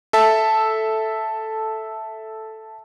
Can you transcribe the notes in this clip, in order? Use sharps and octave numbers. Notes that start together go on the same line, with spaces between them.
A4 E5 A5